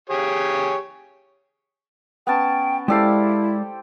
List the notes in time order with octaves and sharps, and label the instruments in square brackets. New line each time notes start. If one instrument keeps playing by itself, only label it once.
[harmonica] G4 G#4 C#5
[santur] B3 C#4 A5 [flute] G5
[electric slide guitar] G#3 D5 F5 [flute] E4 [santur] G4 A4 C5